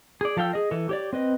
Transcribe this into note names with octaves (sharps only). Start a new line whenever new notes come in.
G#4 D5
F3 A4 F5 G5 E6
G#4 D#5
E3 A4
G4 C#5 D5
C4 B4 D#5